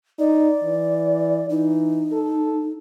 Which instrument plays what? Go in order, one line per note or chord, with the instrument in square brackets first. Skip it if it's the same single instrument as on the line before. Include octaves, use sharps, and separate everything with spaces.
[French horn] D#4 [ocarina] D5
[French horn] E3
[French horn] E3 [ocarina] D#4
[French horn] A4